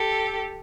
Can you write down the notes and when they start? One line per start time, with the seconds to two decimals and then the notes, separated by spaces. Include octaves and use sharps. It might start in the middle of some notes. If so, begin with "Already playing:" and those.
Already playing: G4 A4